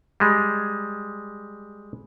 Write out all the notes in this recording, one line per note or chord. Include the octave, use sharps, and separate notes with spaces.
G3 G#3